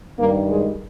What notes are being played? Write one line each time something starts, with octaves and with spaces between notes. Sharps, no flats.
G2 D#3 G3 A#3
G#3